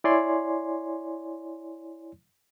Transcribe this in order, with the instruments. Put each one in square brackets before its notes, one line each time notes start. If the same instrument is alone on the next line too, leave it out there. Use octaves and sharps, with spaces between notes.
[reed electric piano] E4 C#5 D5 G#5 C6